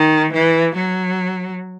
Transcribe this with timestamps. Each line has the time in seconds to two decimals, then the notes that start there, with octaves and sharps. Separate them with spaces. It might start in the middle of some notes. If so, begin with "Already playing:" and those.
Already playing: D#3
0.33 E3
0.75 F#3